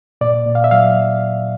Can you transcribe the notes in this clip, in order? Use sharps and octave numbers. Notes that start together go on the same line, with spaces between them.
A#2 D5
A#2
F5
E5
F#3 F5